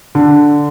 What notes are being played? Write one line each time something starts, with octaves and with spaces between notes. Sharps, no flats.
D3